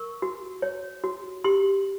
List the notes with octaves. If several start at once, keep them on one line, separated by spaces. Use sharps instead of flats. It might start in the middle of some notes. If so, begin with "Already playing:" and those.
Already playing: A#4 C#6
F#4
C#5
F#4
G4 C6